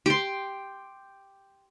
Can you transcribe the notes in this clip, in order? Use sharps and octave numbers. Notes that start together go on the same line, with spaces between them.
G4 C6